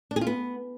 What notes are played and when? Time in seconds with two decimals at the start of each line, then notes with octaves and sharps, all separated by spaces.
0.11 D4
0.16 G#4
0.21 F4
0.27 B3